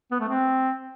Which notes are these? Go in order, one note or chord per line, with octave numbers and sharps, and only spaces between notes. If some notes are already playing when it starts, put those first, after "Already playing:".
B3
A3
C4